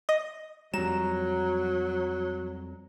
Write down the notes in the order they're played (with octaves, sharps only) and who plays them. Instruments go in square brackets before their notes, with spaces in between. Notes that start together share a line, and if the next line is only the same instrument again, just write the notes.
[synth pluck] D#5
[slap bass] F2 G3 [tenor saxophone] F#3 [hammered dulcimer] A#5 [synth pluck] E7